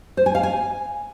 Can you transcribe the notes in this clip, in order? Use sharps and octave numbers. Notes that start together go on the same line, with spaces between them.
C5
G#5
F5
G#5